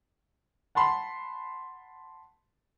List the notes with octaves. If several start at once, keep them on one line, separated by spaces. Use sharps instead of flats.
F#5 A5 B5 C6